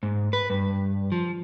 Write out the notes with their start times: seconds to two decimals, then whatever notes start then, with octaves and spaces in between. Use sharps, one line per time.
0.03 G#2
0.33 B4
0.50 G2
1.12 F3